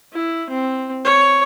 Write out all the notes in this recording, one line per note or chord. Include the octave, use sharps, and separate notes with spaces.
E4
C4
C#5